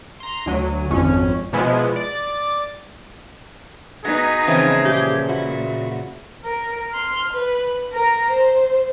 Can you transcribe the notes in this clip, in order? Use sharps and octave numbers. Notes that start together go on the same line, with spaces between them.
A#5 C6
D2 F#3 D#7
G#1 F2 C#4
B2 F3 G#3 B3 E4
D5 A6
B3 D#4 F#4 G#4
C#3 E3 F3 C4
A#2 G4
E4 F#4
A#4
C6 F6
B4
A#4 A#5
C5